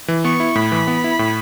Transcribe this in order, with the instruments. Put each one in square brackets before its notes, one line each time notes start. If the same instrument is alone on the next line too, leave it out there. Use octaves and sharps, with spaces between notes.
[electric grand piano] E3
[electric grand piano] B3 [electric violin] C#6
[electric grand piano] E4
[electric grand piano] A2 [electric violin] B5
[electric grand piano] E3
B3
E4
A2